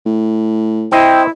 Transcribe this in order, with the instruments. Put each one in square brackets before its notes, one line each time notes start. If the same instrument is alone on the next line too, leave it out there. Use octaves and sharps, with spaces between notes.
[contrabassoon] A2
[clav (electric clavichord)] C4 C5 D#5 [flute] E4 [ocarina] G5